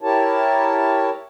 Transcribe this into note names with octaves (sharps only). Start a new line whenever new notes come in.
E4 G4 A#4 C#5 A5